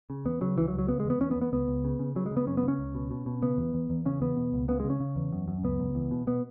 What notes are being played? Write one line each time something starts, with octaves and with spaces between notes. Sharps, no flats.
C#3
E2 B3
C#3 F#3
C#2 E3
F#3
C#2
F#3
C#3 B3
G#3
E2
B3
E2 C#4
B3
E2
B3
C#2 B3
C#2
C#3
C#3
C#3 F#3
G#3
C#3
B3
F#2 C#4
B3
C#3
C#4
C#2
B2
B2
B2
C#3 B3
E2
E2
E2
C#3 C#4
E2 B3
B2
C#2
C#3 B3
G#3
C#3
C#4
C#3
E2
F#2
F#2
C#2 B3
C#2
E2
B2
B2 B3